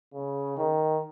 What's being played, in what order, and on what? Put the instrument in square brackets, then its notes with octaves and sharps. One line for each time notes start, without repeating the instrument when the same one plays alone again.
[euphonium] C#3
D#3